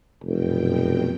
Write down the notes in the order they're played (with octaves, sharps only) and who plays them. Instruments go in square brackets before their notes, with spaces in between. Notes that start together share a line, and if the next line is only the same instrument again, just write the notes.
[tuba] F1 [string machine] F#2 B2 G5